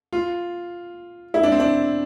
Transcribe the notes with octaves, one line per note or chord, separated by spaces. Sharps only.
F4
E4
D4
C4
D4